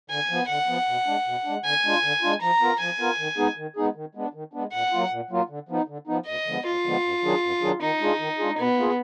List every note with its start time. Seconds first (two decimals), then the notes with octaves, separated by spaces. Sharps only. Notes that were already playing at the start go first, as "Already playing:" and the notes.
0.10 D3 G#5
0.30 F3 B3
0.48 D3 F#5
0.68 F3 B3
0.87 B2
1.06 G#3 D4
1.26 B2
1.45 G#3 D4
1.64 D3 G#5
1.84 G#3 D4 F4
2.03 D3
2.22 G#3 D4 F4
2.41 F3 A#5
2.61 B3 F4 A#4
2.80 F3 G#5
2.99 B3 F4 A#4
3.18 D#3
3.38 G#3 B3 D#4 G#4
3.57 D#3
3.76 G#3 B3 D#4 G#4
3.95 D#3
4.15 G#3 B3 D4
4.34 D#3
4.53 G#3 B3 D4
4.73 A#2 F#5
4.92 F#3 A#3 F4
5.11 A#2
5.31 F#3 A#3 F4
5.49 D3
5.69 F3 B3 D#4
5.88 D3
6.07 F3 B3 D#4
6.26 D2 D#5
6.46 D3 F3 G#3 B3
6.65 D2 F4
6.85 D3 F3 G#3 B3
7.03 F#2
7.23 D#3 F#3 D4 G#4
7.42 F#2
7.61 D#3 F#3 D4 G#4
7.81 D#3 D#4
8.00 G#3 D4 F4 G#4
8.19 D#3
8.39 G#3 D4 F4 G#4
8.58 B2 B3
8.77 A#3 F4 G#4